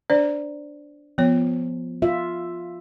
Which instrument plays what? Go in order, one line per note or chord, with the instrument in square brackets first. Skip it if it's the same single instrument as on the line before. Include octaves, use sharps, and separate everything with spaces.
[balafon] D4 C5 D5
[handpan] F3 [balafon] B3 C#5
[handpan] F4 E5